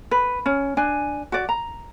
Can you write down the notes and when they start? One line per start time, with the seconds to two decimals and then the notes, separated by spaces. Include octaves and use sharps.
0.11 B4
0.46 C#4
0.77 D4 G#5
1.32 F#4 D5
1.49 A#5